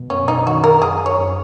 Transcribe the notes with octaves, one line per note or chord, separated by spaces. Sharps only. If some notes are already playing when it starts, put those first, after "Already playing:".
Already playing: B2
F#2 C#4
D#4
D#3 F#4
A#4
F#2 G#4
C#5
F#2